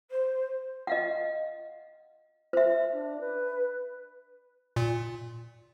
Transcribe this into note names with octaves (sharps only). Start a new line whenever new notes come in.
C5
D#5 F5 F#5
C5 E5
D4
B4
A#2